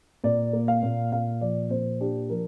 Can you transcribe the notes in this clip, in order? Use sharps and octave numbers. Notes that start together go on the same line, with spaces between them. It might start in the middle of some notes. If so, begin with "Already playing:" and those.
A#2 D5
A#3
F5
A#2
A#2 F5
F3 D5
A#2 C5
D4 G4
F3 A#4